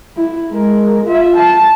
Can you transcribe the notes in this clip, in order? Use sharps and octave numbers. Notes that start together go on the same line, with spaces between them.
E4
G#3 A#4
F4 E5
A5